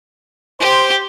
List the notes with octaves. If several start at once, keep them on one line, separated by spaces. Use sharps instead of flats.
G4 C5